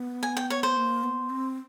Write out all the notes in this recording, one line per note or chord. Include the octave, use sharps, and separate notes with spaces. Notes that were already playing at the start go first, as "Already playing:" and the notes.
Already playing: B3
G#5
G5
C#5
C5
A#3
B3
C4